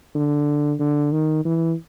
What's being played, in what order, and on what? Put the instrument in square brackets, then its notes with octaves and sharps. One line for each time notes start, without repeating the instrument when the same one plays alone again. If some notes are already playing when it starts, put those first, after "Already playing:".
[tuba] D3
D3
D#3
E3